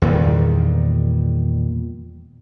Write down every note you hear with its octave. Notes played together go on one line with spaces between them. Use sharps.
E2 A#2 D#3 G3